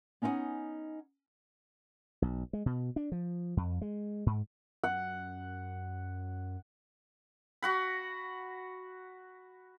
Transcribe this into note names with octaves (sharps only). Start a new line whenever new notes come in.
B3 C#4 D#4 E4 F#5 G#5
B1
G#3
B2
D4
F3
F2
G#3
G#2
F#2 F#5
F#4 F#5 B5